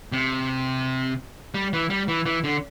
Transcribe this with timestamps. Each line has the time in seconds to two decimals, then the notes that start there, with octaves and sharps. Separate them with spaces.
0.12 C3
1.54 G3
1.73 E3
1.90 G3
2.08 E3
2.26 E3
2.44 D3